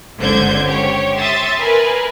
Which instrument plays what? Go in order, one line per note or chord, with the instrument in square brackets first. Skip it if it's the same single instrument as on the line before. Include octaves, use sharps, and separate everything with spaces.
[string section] G1 C#2 D3 C5 G6 G#6
G4 C#5
E5 C6 D#6 A6
A#4 B4 G#5